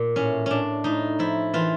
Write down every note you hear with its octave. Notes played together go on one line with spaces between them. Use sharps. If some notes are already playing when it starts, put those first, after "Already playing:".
Already playing: A#2
A2 C#4
A2 C#4 D4
A2 D#4
F3 E4
E3 F4